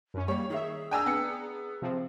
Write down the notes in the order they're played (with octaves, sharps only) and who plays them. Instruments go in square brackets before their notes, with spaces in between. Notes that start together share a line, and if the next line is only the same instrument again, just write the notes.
[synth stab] F#2 C#4
[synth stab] G3 [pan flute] A#3 [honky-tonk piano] C#5
[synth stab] D#3 E5 [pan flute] G#4
[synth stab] D4 A#5 [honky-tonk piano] G5 G#5 E6
[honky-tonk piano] B3 E6 C#7
[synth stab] C3 F3 C4